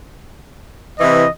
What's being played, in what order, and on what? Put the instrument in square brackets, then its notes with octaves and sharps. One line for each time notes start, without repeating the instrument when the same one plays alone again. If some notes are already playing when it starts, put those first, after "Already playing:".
[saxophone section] C3 E3 [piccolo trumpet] D#5